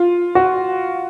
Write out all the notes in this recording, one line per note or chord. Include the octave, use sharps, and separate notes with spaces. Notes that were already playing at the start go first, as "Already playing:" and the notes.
Already playing: F4
F#4